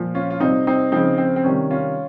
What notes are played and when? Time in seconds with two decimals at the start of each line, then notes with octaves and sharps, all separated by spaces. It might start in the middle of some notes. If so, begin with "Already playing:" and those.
Already playing: A#2 F3
0.15 C#4 F4
0.30 F4
0.40 C3 G3 C4 D#4
0.67 C4 D#4
0.92 C#3 F3 C4 D#4
1.18 C4
1.36 C4
1.44 C3 D#3 G3 C#4
1.71 C#4 F4